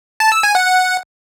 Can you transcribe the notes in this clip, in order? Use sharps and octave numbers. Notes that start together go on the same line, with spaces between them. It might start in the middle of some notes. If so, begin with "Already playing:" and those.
A5
E6
G#5
F#5
F#5